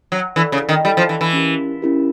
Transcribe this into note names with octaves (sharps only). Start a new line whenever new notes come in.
F#3
E3 E4 A4 D5
C#3
D#3
G3 E4 A4 D5
F3
E3
E3
C#4 E4 G4 A#4
C#4 E4 G4 A#4